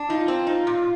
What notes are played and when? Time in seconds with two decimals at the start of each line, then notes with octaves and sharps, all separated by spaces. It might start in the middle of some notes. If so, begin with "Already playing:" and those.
Already playing: D4
0.09 D#4 F4
0.28 C4
0.47 D#4
0.67 A#2